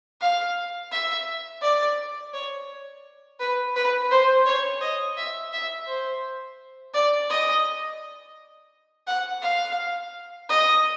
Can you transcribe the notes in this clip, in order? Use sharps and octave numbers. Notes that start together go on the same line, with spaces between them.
F5
E5
D5
C#5
B4
B4
C5
C#5
D#5
E5
E5
C5
D5
D#5
F#5
F5
D#5